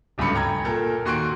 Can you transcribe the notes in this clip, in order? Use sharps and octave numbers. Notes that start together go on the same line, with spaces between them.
D1 C#2 G2 D3 B5 C#7
G5 A#5 G#6
A#2 A4 A#4
D#2 F#4 C6 C#6 F#6 D7